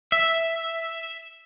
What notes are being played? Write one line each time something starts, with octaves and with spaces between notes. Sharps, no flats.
E5